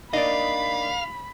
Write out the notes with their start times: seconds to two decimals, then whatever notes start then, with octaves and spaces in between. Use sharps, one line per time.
0.13 A#3 D4 D#4 D5 D#5 F5 B5